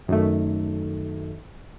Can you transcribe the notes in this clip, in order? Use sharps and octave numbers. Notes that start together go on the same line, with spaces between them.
F#2 D#3 A3